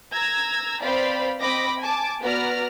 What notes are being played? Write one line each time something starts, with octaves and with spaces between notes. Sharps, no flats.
A#5 E6 G#6
C4 B4 C5 D5 F5 B5
C4 D#5 B5 D6 A#6
G#5 A5 D6
B3 F#4 B4 D5 A#5 F6